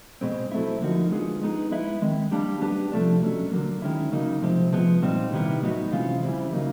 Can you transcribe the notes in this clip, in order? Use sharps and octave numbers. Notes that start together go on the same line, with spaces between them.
B2 G#3 C4
F#3 A3 C4 E4
D3 F3 A#3 D#4 F#4
G#3 B3 D4 F4 G#4
G#3 B3 D#4 G#4
G#3 B3 E4
D#3 G#3 C4
G3 A#3 D4 G4
G3 B3 D4 G4
C3 F3 A3 D4
B2 F#3 A3 C#4
D3 F#3 A#3
D#3 G#3 C#4 E4
C#3 F#3 A#3 D#4
C3 F3 G#3 C4
C3 F3 G#3 B3
A#2 G3 C4 D#4
C3 D#3 G3 B3 E4
A2 F#3 B3 D#4 F#4
C3 E3 G#3 C#4 F4
C#3 E3 G3 C4 E4
C#3 F#3 A#3 D#4